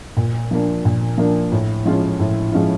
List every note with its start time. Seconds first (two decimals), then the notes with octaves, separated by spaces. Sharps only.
0.17 A#2
0.51 F3 A#3 D4
0.85 A#2
1.18 F3 A#3 D4
1.52 A2
1.85 F3 G#3 C#4 F4
2.20 A2
2.52 F3 G#3 C#4 F4